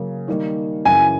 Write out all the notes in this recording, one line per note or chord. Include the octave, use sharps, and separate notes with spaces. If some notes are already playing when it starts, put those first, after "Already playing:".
Already playing: C#3 F#3 A#3 C#4
D#3 G3 A#3
F#2 C#3 E3 G#5